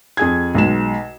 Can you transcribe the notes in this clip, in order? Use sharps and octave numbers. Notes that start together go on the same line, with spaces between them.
F2 G#4 G#6
B1 G#3 E7